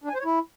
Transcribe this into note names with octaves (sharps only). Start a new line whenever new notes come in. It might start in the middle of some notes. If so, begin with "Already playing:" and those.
D4
G#5
C5
C#5
E4